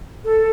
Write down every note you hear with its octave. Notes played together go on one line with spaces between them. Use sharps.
A4